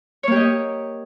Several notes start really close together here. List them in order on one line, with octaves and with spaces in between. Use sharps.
C#5 A#3 G4 D#5